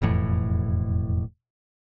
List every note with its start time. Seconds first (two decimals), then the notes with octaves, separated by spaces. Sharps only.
0.02 E1 F2 A2 E3